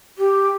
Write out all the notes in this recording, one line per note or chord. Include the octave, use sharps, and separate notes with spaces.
G4